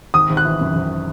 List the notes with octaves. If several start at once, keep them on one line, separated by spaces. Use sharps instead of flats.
G#1 D#6
G#1
F#6
E3
F#2
G#1